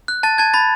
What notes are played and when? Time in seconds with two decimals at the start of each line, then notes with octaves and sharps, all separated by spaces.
0.08 F#6
0.23 A5 A6
0.38 A5 G#6
0.54 B5 A6